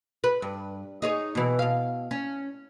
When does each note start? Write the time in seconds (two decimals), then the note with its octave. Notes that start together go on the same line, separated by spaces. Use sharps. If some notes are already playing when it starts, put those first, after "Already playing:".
0.24 B4
0.42 G2
1.02 D#4 G#4 C#5
1.35 B2 E3
1.59 B2 F5
2.11 C#4